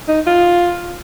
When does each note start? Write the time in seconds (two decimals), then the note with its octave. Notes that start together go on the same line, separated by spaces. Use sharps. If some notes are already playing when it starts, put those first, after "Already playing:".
0.08 D#4
0.27 F4